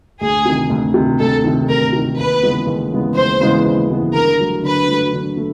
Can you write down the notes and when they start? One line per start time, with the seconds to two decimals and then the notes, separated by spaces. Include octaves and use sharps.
0.21 D2 G#4
0.45 C3 D#3
0.70 D2
0.94 C3 D#3
1.19 D2 A4
1.44 C3 D#3
1.68 D2 A#4
1.93 C3 D#3
2.17 D#2 B4
2.42 C#3 E3 G#3 B3
2.67 D#2
2.92 C#3 E3 G#3 B3
3.16 D#2 C5
3.41 C#3 E3 G#3 B3
3.65 D#2
3.89 C#3 E3 G#3 B3
4.14 D3 A#4
4.39 F#3 A3
4.63 D3 B4
4.88 F#3 A3
5.13 D3
5.37 A3